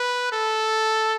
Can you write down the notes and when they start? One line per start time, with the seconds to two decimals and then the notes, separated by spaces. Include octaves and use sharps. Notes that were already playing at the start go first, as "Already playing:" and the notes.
Already playing: B4
0.32 A4